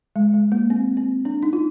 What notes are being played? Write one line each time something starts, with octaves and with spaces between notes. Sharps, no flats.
G#3
G#3
A#3
C4
C4
D4
D#4
F4